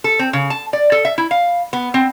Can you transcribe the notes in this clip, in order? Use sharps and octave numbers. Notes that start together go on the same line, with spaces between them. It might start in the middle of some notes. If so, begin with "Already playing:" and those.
A4
C4
C#3
A5
D5
A4
E5
E4
F5
B3
C4